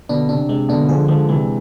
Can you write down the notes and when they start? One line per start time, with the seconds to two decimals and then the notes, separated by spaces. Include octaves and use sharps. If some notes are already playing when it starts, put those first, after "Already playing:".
0.09 B2 D3 D4
0.29 C3 D4
0.49 C3 G#3
0.69 B2 D3 D4
0.88 D3 F3 G#4
1.08 D3 F3 G#3
1.29 C3 E3 G#3